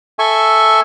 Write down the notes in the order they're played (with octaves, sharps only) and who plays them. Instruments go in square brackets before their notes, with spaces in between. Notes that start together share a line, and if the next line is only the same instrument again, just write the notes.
[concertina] A4 E5 G#5 C#6